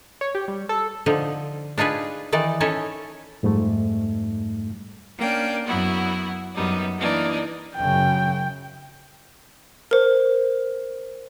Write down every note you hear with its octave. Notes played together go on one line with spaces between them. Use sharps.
C#5
G4
G3
A4
D3 F3 D#4
D4 D#4 F4 G#4 B4
D#3 E3 D#4 D5
C#4 D#4 E4 A4 C#5
F2 G#2 G3 A3
A#3 C#4 D4 G5
F#2 B3 E4 F#4
F#2 G3 B3 D#4
E3 A#3 D4 D#4
F#2 C#3 G5
A#4 C5